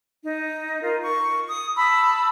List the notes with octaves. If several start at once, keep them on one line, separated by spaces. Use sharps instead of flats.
D#4
F4 A#4
C#6
D#6
A5 B5 E6